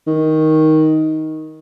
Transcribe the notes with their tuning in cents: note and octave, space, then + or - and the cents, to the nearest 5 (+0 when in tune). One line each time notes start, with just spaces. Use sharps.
D#3 +10